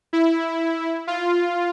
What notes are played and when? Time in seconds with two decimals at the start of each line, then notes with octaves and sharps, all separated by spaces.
0.13 E4
1.07 F4